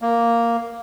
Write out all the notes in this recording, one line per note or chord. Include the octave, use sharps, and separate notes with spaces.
A#3